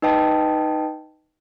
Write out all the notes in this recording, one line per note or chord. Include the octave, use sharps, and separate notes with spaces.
D#4 B4 D#5 G5 A5